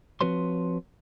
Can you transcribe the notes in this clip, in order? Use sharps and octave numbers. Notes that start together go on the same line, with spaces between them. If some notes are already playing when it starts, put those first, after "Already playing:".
F3 C4 F#4 B4 C#5 C6